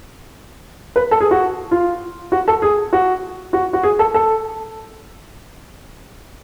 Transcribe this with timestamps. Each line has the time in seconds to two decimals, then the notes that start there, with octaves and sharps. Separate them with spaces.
0.96 B4
1.11 A4
1.20 G#4
1.31 F#4
1.71 F4
2.32 F#4
2.48 A4
2.62 G#4
2.93 F#4
3.53 F#4
3.73 F#4
3.83 G#4
3.99 A4
4.14 A4